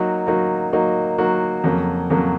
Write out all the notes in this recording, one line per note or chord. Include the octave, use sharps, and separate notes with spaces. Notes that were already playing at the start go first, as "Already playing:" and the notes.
Already playing: F#3 A#3 D#4 F#4
F#3 A#3 D#4 F#4
F#3 A#3 D#4 F#4
F#3 A#3 D#4 F#4
F2 C#3 F#3 A#3
F2 C#3 F#3 A#3